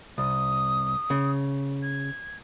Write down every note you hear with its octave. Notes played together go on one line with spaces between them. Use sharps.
C2 D#6
C#3
G#6